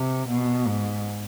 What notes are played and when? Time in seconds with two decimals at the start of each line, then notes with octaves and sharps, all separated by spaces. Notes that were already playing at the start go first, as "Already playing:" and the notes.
Already playing: C3
0.29 B2
0.67 G#2